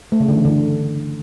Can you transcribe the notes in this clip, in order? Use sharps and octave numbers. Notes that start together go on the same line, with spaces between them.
A3
C#3
D3
E3
D3